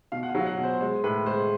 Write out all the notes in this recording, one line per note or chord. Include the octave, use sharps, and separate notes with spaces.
B2 F5
F#5
F5
F#3
F5
F#5
B2
C5
G#3 C5
A2 B4
G#3 C5